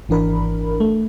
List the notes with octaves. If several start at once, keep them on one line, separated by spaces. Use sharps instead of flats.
G#1 E3 D4 A#4 B5
A3